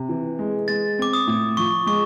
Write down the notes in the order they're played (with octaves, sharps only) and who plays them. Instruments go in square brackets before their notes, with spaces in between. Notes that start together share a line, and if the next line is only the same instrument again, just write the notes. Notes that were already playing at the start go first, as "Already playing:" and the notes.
Already playing: [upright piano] C3
E3
G#3
[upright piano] G#3 [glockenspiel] A6
[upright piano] C4 [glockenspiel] D6
[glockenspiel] D#6
[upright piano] A2
[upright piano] F3 [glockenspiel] C#6
[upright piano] G#3 [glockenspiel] C#6